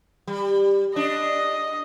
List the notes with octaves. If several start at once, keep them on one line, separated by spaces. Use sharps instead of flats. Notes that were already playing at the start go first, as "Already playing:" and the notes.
G3
D4 D#5